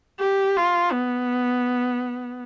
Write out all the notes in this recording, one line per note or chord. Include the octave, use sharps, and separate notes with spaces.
G4
F4
B3